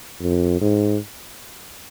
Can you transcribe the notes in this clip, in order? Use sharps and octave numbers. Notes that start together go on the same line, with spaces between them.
F2
G#2